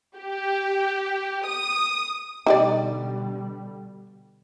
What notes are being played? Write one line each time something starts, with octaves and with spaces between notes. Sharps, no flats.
G4
D#6
B2 D3 G3 D#4 G4 D5